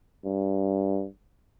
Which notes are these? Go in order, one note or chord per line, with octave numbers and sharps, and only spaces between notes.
G2